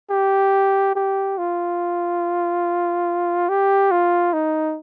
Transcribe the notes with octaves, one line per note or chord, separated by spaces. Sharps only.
G4
G4
F4
G4
F4
D#4